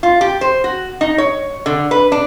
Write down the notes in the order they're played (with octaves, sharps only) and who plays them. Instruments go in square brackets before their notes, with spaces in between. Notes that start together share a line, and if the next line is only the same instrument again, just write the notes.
[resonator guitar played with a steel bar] F4
G4
C5
F#4
D#4
C#5
D3
B4
D4